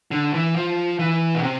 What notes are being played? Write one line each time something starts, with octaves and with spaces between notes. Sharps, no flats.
D3
E3
F3
E3
B2
C3